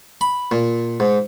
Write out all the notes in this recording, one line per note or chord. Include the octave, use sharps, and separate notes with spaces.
B5
A#2
G#2